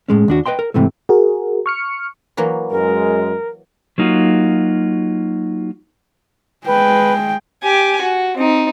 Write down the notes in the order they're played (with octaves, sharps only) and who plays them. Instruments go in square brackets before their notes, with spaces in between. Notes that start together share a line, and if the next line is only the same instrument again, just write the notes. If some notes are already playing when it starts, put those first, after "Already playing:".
[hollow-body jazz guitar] A2 G#3 C#4
D#2 D4 F#4
B4 D#5 G5 C6
A#4
G#2 C3 E3 A3
[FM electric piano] F#4 G#4 A#4
C#6 F6 C#7
[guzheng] E3 F#3 A#3
[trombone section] F#2 G#3 [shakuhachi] A#4
[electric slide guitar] F#3 A#3 D#4 F4 F#4
[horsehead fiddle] G#3 G5 [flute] B4
[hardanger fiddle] G4 G#5
F#4
C4 D#4